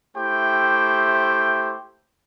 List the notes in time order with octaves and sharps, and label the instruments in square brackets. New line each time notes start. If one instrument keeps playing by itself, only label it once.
[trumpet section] A3 E4 G4 C5 G5